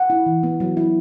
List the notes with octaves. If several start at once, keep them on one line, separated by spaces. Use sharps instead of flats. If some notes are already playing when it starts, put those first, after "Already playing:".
Already playing: F#5
E4
E3
B3
F#3
E4